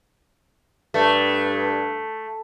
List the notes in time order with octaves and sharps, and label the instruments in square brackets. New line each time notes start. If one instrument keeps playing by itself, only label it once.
[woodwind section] G2 [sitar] A3